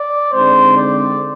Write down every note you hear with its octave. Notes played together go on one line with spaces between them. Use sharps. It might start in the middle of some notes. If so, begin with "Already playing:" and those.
Already playing: D5
D3 G#3 C4 D#4 C5
D5